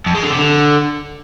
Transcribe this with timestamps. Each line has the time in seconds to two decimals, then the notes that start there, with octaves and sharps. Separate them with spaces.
0.06 F2
0.15 G#3
0.23 D3
0.31 C3
0.39 D3